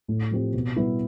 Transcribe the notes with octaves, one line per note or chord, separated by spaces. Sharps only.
A2
F3 C4 G4
B2
G3 B3 E4 B4